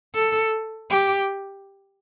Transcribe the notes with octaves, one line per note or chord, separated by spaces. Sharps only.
A4
G4